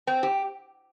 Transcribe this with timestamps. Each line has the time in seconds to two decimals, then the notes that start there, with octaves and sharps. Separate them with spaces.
0.07 C4
0.23 G4